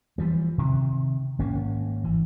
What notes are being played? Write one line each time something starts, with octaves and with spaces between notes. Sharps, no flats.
E3 F3 G3
C3 D#3
G#1 A#3 C#4
E3